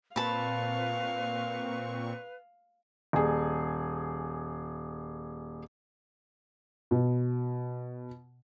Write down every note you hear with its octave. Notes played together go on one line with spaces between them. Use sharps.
A#2 C4 B4 F5 A5 B5 C#6
D#1 G#4
B2